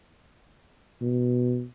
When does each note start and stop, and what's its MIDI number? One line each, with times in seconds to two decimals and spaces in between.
1.01 1.64 47